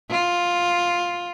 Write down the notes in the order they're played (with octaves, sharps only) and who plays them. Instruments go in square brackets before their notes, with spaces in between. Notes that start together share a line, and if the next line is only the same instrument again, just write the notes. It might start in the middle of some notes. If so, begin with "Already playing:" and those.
[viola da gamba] F4